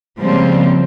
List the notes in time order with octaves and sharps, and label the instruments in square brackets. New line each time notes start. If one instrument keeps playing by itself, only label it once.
[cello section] C#3 F3 G3 G#3 A#3 C4